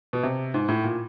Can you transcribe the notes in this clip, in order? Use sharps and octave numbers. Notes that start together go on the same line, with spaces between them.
B2
C3
G#2
A2
A#2